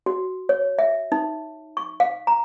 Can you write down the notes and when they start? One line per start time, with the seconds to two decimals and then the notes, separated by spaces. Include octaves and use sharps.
0.06 F#4
0.49 C#5
0.79 E5
1.12 D#4
1.77 C#6
2.00 F5
2.27 A#5